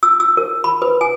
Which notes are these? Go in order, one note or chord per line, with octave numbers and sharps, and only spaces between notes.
E6
E6
A#4
B5
B4
G#5